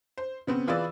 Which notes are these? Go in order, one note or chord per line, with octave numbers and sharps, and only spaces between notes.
C5
C#3 B3 C4
E3 F4 G#4 B4 D5 E6